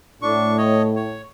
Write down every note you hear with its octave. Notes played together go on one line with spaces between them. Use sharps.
A2 D4 C#6
C#5 D#5
C#5